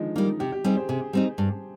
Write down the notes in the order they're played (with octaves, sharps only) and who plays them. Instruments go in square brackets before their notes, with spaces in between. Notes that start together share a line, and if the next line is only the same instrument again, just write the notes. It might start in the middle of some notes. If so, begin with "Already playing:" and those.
Already playing: [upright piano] D3 D#3 F3 G#3
[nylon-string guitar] G3 A#3 [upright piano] D#4
[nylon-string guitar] C3 [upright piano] G4
[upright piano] G4
[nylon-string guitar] G3 C4 D#4 [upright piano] G#4
[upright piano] C5
[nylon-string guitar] C3 [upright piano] G#4
[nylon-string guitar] G3 C4 D#4
G2